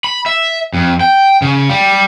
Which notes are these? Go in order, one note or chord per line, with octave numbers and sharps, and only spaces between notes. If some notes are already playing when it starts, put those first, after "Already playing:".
B5
E5
F2
G5
C#3
G3